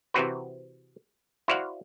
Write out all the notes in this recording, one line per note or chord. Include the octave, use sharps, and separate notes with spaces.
C3 E3 C4 F#4 B4
E4 F#4 C5 D5 F5 F#5